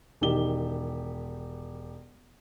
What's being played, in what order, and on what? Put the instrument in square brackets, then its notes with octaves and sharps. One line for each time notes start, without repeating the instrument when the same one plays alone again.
[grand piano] E1 D#3 G4 G7